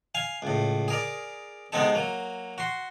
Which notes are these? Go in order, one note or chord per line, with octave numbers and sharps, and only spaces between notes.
F5 G#5
C#2 A2
G#4 A#4 D5
C3 G#3 B3 C4 D#4 A4
F#3 A#3
F#4 C6